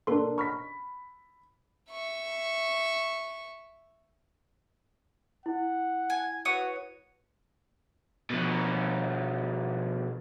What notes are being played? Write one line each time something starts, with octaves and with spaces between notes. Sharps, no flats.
A#3 D4 A4 B4 C6
B5 C#6 F6 B6
E5 C#6
E4 F#5
G#5
F#4 B4 C#5 D#6
B2 F3